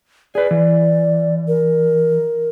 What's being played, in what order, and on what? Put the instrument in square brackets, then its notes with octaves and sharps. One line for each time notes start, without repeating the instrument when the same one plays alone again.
[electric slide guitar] G#4 B4 [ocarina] D5
[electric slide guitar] E3
[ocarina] A#4